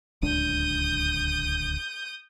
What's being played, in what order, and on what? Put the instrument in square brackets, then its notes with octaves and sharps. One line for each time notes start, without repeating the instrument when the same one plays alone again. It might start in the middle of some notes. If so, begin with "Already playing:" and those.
[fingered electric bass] D1 C#2 D4 [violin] D#6 G6